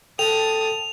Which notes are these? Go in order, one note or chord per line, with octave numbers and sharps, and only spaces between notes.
A4 G5 A5 D#6 F7